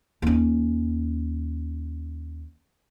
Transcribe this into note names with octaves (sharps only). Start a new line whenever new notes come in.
D#2 C#4